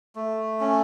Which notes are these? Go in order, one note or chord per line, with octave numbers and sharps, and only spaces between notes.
A3
C#4